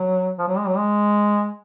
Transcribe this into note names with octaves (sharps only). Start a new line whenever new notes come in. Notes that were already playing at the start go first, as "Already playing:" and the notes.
Already playing: F#3
F3
F#3
G#3
F#3
G#3